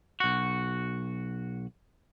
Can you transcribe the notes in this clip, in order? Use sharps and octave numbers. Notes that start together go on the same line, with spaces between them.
B1 F#4